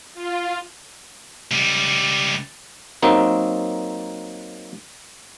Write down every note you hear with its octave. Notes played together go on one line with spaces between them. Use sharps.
F4
C#2 G3
F#3 A#3 C4 D#4